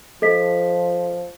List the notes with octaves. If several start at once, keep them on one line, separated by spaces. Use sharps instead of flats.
F3 A4 D#5 B6